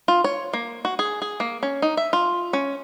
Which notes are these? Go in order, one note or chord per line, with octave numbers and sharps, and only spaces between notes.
F4
C#5
A#3
F#4
G#4
G#4
A#3
C#4
D#4
E5
F4
C#4